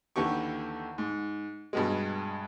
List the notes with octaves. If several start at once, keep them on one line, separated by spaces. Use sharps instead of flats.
D#2 D3 E3 G4 C#6
G#2
G2 B2 G#3